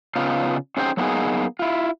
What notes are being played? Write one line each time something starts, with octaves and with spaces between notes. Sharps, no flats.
C#3 B3 D#4 F4
C#4 D#4 G#4 C5 D#5 G5
F#3 A#3 B3 D#4 G#4
E4 F4